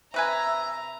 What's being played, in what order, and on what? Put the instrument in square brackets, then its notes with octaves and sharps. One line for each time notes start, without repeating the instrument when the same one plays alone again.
[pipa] C3 B4 G#5 [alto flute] E5 [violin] A#5